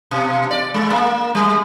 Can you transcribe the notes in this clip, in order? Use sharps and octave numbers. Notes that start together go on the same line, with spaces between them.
B2
D5
G#3
A#3
G3